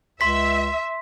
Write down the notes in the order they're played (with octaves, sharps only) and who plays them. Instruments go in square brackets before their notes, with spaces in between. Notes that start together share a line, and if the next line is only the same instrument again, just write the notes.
[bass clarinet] C#2 [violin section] E5 [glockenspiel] C6 B6